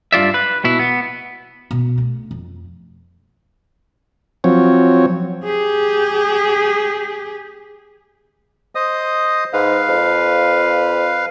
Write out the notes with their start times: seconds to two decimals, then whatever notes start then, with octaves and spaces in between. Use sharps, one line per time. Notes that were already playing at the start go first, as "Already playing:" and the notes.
0.12 G2 F4 D5 E5
0.34 B4
0.64 B2 E4
0.79 B3
1.71 B2
1.98 A3
2.31 F2
4.44 F3 F#3 C4 C#5
5.45 G4 G#4
8.75 C5 D#5 D#6
9.53 G#2 B4 F5
9.88 F2